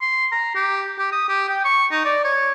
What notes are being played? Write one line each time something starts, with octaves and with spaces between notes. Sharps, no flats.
C6
A#5
G4
G4
D#6
G4
G5
C#6
D#4
D5
C#5